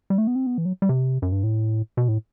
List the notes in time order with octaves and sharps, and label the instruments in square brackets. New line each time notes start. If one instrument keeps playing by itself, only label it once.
[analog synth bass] G3
A3
B3
C4
B3
E3
F#3
G3
C3
F#2
G2
A2
B2
A2